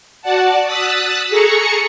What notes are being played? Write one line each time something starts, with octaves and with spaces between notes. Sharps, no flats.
F#4 D5 F#5 A5
D#6 E6 F#6 A6 B6
G#4 A4 A#5 C#6 C#7